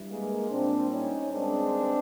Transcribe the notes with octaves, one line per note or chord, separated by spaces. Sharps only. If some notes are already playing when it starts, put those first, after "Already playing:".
Already playing: G2 E3
G#3 A#3
A#2 G3 C4 D4
C#4 D#4
G2 D#3 G#3 C4 D4